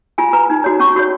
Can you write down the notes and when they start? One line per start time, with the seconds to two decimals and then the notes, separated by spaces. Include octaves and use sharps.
0.18 F4 G#5
0.33 B4 A#5
0.50 D#4
0.64 F#4 C#5
0.80 C#4 C#6
0.96 F#4 C#5